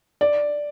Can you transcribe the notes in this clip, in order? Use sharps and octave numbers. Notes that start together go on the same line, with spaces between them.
D5